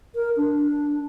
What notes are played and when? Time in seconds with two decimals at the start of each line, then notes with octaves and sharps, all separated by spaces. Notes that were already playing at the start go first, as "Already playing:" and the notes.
0.15 A#4
0.37 D4